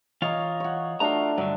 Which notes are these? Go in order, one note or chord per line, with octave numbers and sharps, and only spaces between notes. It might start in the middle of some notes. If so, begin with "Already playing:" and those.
E3 F4 C#5 D#5 F5 A#5
C#5 F#5
A3 D4 F4 F#4 A#5
G2 D3 F#3